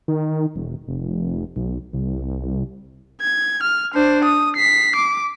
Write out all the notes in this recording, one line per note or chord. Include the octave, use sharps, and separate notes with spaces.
D#3
E1
F1
B1
C2
G#6
F6
D4 C5
D#6
B6 C7
D6